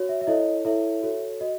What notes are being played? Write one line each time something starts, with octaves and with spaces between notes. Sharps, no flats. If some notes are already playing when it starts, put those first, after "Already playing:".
Already playing: F#4 C#5
E5
E5
E4 A4 C#5 D#5
E4 A4 C#5 E5
F#4 A4 C#5
F#4 D#5